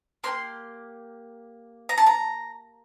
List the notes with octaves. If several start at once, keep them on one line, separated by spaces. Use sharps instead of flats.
A#3 D4 G4 C6
A#5
A5
A#5